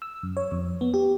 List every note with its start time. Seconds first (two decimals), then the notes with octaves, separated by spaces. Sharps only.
0.02 E6
0.23 F#2
0.37 C#5
0.51 F2
0.81 B3
0.94 G4